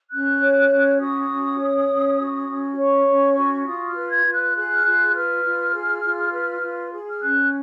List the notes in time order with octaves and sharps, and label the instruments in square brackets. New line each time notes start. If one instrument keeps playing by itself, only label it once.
[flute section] C#4 F#6
C#5
C#4
F#4 D#6
C#4
C#5
C#4
F#4
C#4
C#5 C#6
C#4
F#4
F4 D#6
F6
B4
G#6
F4
F#6
G#4 F#6
F6
F4 F#6
B4 F6
F4
G#4
F4
B4
F4
G#4
F6
C#4 F#6